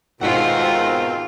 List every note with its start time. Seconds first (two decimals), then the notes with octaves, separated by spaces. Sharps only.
0.21 D#2 G#2 B2 D#3 A3 C4 F4 F#5